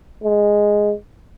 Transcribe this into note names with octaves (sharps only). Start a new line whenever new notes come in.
G#3